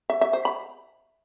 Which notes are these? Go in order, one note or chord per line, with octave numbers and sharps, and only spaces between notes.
E5
E5
C5
B5